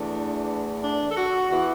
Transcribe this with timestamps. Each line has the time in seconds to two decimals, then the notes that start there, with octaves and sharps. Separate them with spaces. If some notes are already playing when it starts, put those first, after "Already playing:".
Already playing: E2 E3 A3 D4
0.83 D4
1.11 A4
1.16 F#4
1.49 E2 E3 B3 F#4